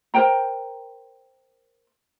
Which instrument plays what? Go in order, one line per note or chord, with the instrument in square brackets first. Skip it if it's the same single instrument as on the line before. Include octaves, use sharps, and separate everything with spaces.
[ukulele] A#4 C5 G5 A#5